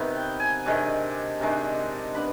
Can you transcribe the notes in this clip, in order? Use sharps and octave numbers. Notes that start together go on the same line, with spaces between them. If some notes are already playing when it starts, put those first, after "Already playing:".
Already playing: C3 D#3 B3
G5
G#5
C3 D#3 G#3 D4
C3 D#3 G#3 D4
B3 D4 B5